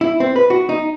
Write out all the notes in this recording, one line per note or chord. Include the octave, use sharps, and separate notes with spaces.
E4
C4
B4
F#4
D#4